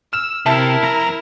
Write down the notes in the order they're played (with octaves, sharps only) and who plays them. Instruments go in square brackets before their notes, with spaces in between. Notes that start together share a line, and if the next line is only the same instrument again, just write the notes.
[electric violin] E6 [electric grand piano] F6 E7
[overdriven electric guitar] C3 [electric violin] E4 A#4 [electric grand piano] E5 A5
[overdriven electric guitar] F2 A#5